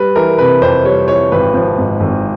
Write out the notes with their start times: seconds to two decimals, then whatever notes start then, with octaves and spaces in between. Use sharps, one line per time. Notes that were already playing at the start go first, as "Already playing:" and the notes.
Already playing: G3 B4
0.16 E3 A#4
0.39 C3 B4
0.62 F2 C5
0.85 G3 C#5
1.08 E3 C#5
1.32 G#1 B4
1.54 F3
1.78 G#2
2.00 G#1